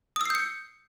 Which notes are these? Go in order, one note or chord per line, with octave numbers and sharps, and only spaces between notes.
D#6 E6 G6 C7 C#7